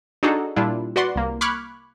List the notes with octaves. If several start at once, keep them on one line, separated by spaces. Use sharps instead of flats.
D4 D#4 F#4 G#4 A4
A#2 G3 D4 E4 F4
F#4 B4 D5 F#5 C6
C2 A#3
B5 C#6 D6 F6 F#6 G#6